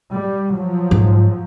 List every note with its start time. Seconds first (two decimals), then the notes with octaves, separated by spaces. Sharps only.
0.13 G3
0.53 F3 F#3
0.91 G#2